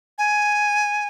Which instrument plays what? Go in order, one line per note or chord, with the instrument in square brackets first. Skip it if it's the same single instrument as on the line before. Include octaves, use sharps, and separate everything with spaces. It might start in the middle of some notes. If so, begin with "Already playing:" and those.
[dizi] G#5